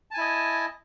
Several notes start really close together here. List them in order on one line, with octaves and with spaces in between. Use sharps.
A5 G#5 E4 D#5